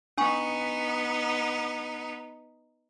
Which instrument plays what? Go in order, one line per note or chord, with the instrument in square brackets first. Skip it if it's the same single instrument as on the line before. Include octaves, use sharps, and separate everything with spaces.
[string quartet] B3 D#4 [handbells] D4 G#5 C#6